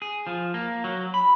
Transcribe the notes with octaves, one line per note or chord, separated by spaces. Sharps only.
G#4
F3
A#3
F#3
B5